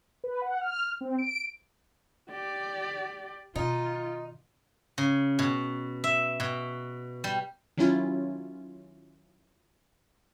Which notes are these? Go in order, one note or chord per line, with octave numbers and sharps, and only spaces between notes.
B4
F#5
F6
C4
D7
G4 D5
B2 D#3 D#4 F4
C#3
B2
E5
B2
G3
D#3 F#3 C#4 E4 F4